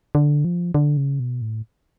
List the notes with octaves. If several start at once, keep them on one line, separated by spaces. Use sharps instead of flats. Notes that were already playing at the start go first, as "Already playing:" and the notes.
D3
F3
D3
C#3
B2
A2